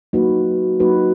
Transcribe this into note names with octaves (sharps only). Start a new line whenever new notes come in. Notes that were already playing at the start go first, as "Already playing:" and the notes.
F#3 A#3 D#4 F#4 B4
F#3 A#3 D#4 F#4 B4